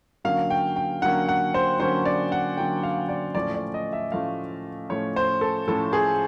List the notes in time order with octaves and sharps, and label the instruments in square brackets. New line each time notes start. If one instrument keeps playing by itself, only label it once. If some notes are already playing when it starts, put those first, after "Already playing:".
[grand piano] D3 F#3 A#3 C#4 F5
G5
G5
D3 F#3 A#3 C#4 F#5
F#5
C5
D3 F#3 A#3 C#4 C5
D5
F#5
D3 F#3 A#3 C#4 G5
F5
D5
A2 F3 A3 C#4 D5
D5
D#5
E5
A2 F3 A3 C#4 F5
A2 F3 A3 C#4 C#5
C5
A4
A2 F3 A3 C#4 A4
G#4